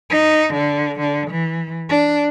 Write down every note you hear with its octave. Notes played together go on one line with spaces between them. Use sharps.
D#4
D3
D3
E3
D4